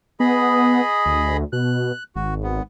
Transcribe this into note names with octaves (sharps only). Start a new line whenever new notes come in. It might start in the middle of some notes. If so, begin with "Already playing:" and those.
B3 G#4 D#5 B5
D2
B2 F#6
G#1 F#4
B3